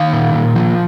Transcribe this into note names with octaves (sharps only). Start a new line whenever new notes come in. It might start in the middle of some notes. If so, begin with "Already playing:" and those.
Already playing: D#3 F5
A#2
A#2
F3